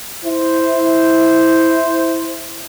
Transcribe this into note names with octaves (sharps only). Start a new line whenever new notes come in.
E4 C5